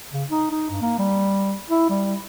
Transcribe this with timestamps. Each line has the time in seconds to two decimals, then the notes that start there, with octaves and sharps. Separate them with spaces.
0.13 C#3
0.30 D#4
0.51 D#4
0.70 G2
0.82 A#3
0.99 G3
1.69 E4
1.90 G3